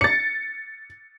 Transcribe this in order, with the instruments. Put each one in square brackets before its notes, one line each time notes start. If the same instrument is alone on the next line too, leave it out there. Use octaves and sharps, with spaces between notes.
[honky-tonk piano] A6 C#7